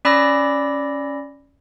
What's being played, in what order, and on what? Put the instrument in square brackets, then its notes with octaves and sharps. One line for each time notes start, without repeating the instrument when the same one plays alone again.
[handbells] C#4 D5 B5 D6 E6 A#6